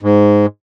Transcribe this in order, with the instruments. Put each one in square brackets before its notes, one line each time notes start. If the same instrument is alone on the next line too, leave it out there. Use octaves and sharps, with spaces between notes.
[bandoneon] G#2